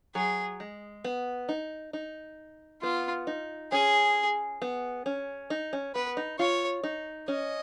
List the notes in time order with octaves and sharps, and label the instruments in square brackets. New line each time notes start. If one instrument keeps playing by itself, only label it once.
[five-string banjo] F#3 [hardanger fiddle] G#4
[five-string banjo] G#3
B3
D#4
D#4
[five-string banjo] B3 [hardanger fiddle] F4
[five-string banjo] D#4
[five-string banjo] C#4 [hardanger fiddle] G#4
[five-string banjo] B3
C#4
D#4
C#4
[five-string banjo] B3 [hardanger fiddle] B4
[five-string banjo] D#4
[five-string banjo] F4 [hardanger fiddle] C#5
[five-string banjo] D#4
[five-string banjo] C#4 [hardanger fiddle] D#5